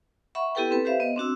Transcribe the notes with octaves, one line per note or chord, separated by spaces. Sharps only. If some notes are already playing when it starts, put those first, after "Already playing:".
E5 F#5 B5 C#6
B3 E4 G4 A4 B4 G5
C4 A4 B4 B5
G4 B4 C5 E5 F5
B3 D#5
C4 D4 F#4 E6